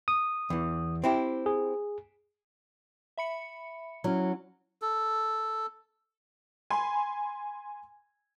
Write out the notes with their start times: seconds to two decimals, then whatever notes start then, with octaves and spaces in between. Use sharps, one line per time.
0.08 D#6
0.50 E2 E3
1.04 C4 E4 G4
1.46 G#4
3.18 E5 B5 C#7
4.04 F#3 C#4 E4
4.82 A4
6.70 G#5 B5 C6